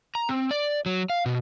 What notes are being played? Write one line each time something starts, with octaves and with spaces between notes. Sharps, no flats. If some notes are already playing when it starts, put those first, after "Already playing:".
A#5
C4
D5
F#3
F5
B2